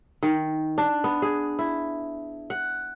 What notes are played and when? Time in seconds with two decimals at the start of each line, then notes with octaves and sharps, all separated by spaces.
0.23 D#3
0.78 D4
1.04 B3
1.22 G#4
1.59 E4
2.50 F#5